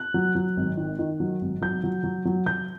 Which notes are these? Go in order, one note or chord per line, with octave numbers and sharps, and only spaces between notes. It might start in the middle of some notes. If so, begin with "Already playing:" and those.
Already playing: F#6
F#3
F#3
G#1
D#3
D#3
F#3
G#1
F#3 G6
F#3
F#3
F#3
F#3 G6